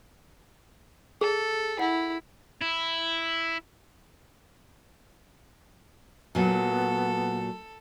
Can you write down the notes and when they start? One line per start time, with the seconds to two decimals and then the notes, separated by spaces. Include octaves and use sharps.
1.21 G#4 A4
1.79 E4 F#5
2.61 E4
6.35 A#2 F#3 B3 A4